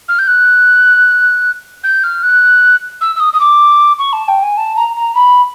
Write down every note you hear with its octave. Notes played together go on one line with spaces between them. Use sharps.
F6
G6
F#6
G6
F6
F#6
E6
E6
D#6
D#6
D6
C#6
A5
G5
G#5
A5
A#5
A#5
B5